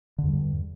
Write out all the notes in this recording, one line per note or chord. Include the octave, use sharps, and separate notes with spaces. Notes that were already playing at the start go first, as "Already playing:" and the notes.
E2 G2 D3 G3